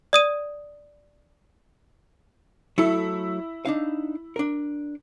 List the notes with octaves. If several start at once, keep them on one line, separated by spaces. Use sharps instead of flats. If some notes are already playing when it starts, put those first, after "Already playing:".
D5 D#6 D#7
F#3 A3 E4 A4
D4 D#4 F5
D4 A#4